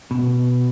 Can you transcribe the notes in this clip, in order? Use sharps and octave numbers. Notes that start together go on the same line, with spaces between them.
B2